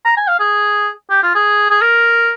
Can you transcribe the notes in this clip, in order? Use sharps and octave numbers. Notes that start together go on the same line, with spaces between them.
A#5
G#5
F5
G#4
G4
F4
G#4
G#4
A#4